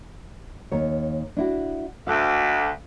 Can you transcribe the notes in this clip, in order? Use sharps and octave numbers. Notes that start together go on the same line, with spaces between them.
D#2 C#5
D4 E4 F#4
D2 F5